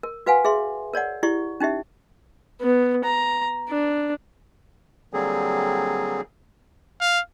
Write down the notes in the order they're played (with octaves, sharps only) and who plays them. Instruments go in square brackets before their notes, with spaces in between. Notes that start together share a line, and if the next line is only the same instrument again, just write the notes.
[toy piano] A#4
F#4 B4 F5 F#5 G#5
G#4 E5 C6
A#4 C#5 D5 F#5
E4 G4 D5 C#6
C#4 D#4 G4 E5
[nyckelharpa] B3
A#5
D4
[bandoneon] D3 F#3 G3 A#3 C4 G#4
[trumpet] F5